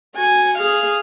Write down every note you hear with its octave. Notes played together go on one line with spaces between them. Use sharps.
F#4 G#5
G#4 F5